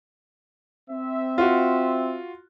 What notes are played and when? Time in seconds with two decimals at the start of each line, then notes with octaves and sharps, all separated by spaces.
0.89 C4 E5
1.38 F4 F#4